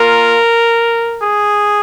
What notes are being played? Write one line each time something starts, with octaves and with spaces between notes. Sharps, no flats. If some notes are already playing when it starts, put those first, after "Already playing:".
Already playing: A#3 F4 A#4
G#4